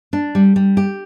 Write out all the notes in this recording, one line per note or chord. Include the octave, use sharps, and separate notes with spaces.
D4
G3
G3
G4